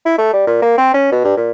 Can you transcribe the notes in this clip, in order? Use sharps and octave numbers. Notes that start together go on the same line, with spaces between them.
E4
A3
G3
A#2
A#3
C4
C#4
B2
G2
A#2